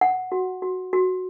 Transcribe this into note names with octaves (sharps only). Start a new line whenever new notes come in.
F#5
F#4
F#4
F#4